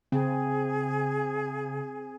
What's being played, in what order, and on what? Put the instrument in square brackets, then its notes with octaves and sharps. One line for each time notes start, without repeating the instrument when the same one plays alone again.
[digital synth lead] C#3 [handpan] C4 [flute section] G#4 G#5